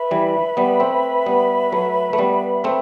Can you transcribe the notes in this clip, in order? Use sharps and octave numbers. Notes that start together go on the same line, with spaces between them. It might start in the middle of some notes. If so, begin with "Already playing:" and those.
Already playing: B4 E5 B5
E3 G3
G3 B3
A3 C4
G3 B3
F#3 A3
A3
G3 B3
A3 C4